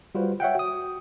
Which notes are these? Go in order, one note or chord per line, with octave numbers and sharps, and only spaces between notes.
G3 F4 F#4 B4 C5
C#5 E5 F#5 G5
F#4 D#6